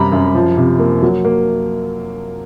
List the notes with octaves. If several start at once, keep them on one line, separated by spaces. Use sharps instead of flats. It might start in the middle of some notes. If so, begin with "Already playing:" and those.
Already playing: F#2 C3 G3 A#5 B5
F#2
F3
C3
A#3
F#3
A#3